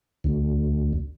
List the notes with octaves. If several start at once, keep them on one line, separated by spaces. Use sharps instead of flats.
D2